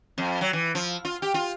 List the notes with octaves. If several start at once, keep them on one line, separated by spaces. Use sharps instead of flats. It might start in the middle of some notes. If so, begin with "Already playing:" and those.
F2
F#3
E3
F3
F4
G4
F4